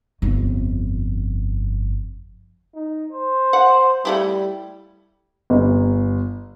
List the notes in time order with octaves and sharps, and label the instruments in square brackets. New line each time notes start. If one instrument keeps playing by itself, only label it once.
[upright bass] G1 F2
[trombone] D#4
C5
[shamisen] F#5
[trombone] G3 [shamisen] A3 E4 G4
[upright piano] G1